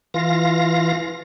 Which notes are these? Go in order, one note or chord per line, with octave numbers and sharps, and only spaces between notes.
E3 F4 F5 A#6